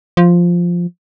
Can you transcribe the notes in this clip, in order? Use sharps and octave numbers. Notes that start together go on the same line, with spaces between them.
F3